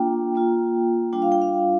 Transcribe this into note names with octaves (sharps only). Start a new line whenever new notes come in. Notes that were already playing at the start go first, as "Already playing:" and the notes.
Already playing: A#3 D4 F4 G5
A#3 F4
G3 D4 F4 G5
F5
G5
F5